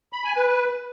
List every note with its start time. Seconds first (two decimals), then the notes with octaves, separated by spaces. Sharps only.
0.13 B5
0.24 G#5
0.36 B4
0.48 B4